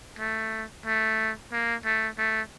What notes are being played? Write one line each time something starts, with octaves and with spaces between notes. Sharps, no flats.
A3
A3
A#3
A3
A3